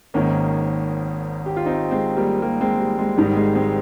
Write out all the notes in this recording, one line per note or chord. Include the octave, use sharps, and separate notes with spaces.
G#1 G#2 D#3 A#3 C#4
G4
F4
C4 D#4
G#3 C4
G3 A#3
G3 A#3
G#3 C4
G3
G#3
G#1 G#2 D#3 G3
G#3
G#3 C4